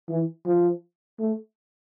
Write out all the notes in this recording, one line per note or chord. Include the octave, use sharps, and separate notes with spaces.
E3
F3
A3